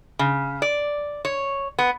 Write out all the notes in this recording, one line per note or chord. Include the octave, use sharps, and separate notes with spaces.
C#3
D5
C#5
B3